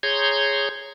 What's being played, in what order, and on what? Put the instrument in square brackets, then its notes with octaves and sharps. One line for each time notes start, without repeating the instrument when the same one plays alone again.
[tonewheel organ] G#4 C#5 A#5 C6 G6 G#6